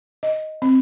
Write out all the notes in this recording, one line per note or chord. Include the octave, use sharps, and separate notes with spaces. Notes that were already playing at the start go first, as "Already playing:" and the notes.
D#5
C4